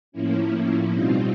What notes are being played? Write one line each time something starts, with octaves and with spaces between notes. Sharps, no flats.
A2 F3 A#3 C#4 E4
B2 G3 C4 D#4 F4